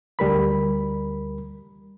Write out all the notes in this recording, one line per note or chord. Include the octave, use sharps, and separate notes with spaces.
D2 G3 A#4 B5